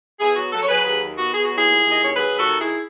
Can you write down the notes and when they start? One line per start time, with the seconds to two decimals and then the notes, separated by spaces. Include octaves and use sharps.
0.19 B3 E4 G#4
0.36 F#3 F#4
0.52 F#3 F#4 A4
0.63 C#5
0.69 F#3 G#4 B4
0.85 D#2 G#4 B4
1.01 D#3
1.17 B3 F#4
1.34 B3 G#4
1.45 F#4
1.50 F#3
1.57 E4 G#4
1.66 D#2
1.83 D#2
1.90 D#5
1.99 D#2 C#5
2.15 F#3 G#4 B4
2.32 D#2
2.37 F#4 A4
2.48 D#3
2.59 E4 G#4